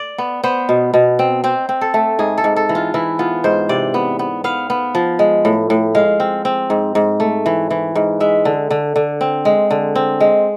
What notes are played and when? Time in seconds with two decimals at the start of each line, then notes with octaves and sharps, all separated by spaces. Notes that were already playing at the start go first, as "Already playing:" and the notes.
Already playing: D5
0.18 B3
0.43 B3 C5
0.69 B2
0.94 B2
1.19 C4
1.44 C4 C5
1.69 C4
1.81 A4
1.94 A3
2.19 G#2 G#4
2.38 A4
2.44 G#2
2.56 A4
2.69 E3
2.75 F4
2.94 E3 E4
3.19 B3 F4
3.44 G#2 C5
3.69 C3 D5
3.94 B3
4.19 B3
4.44 B3 F5
4.70 B3
4.95 F3
5.19 G#3
5.45 A2
5.70 A2
5.95 G#3 F5
6.20 C4
6.45 C4
6.70 G#2
6.95 G#2
7.20 A3
7.46 E3
7.70 E3
7.95 G#2
8.20 G#3 E5
8.45 D3
8.71 D3
8.96 D3
9.21 C4
9.45 G#3
9.71 D3
9.95 C4
10.20 G#3